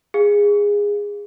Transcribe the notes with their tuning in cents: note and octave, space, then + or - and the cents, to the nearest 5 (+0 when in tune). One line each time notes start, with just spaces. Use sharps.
G#4 -15 F5 +0